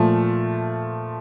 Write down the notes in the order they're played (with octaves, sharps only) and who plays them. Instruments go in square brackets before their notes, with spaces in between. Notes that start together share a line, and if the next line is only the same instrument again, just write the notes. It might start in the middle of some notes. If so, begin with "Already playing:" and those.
Already playing: [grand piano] A#2 F3 A3